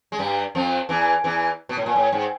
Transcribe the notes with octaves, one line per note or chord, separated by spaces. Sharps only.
G#3
G2 G3
F2 F3
E2 E3
E2 E3
B2
A2
A#2
A2
G#2